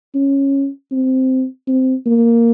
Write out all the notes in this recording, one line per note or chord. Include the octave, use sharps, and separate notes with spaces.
C#4
C4
C4
A#3